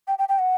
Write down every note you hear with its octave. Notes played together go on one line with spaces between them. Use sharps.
G5
G5
G5
F#5